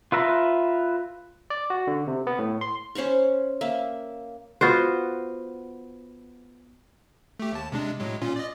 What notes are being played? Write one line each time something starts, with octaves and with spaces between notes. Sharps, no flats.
F4 B4 E5 A#5
D5
F#4
D3
C3
B3
A2
C6
C#4 C5 B5 C#6
A#3 E5
B3 F4 F#4 C5
A3 G4
D#2 A5
C3 G#3 D4
A2 F#3 G#3
A#2 C#4 F4
D5 D#5